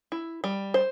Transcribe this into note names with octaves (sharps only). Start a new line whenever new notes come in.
E4
G3
C5